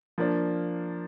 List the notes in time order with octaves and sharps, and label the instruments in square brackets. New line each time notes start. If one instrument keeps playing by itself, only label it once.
[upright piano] F3 A#3 D4